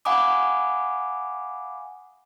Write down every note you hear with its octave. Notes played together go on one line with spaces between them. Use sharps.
F5 F#5 G#5 B5 D6 D#6